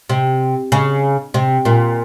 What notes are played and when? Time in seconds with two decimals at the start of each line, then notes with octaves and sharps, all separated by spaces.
0.09 C3
0.72 C#3
1.34 C3
1.65 A#2